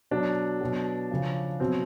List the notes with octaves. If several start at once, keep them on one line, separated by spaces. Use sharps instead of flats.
B2 F#3 D4
B2 F#3
C#3 F3
B2 F#3 C4